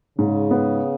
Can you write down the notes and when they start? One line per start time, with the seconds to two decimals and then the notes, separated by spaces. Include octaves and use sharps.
0.18 G#2 C#3
0.51 B3